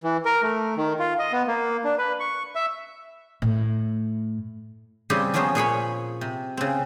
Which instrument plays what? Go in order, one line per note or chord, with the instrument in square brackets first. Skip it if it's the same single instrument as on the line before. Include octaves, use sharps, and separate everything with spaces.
[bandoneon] E3
A#4
A3
D#3
F4
D#5
B3
A#3
D4
B4
C#6
E5
[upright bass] A2
[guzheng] C#3 G3 C4 G4 G#4
F3 F#3 B3 C#4 G#4 C5
A#2 G#4 C#5 B5
C3
C#3 C4